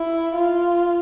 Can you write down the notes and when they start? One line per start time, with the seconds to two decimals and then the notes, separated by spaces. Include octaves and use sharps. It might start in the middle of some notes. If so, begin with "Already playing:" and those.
Already playing: E4
0.35 F4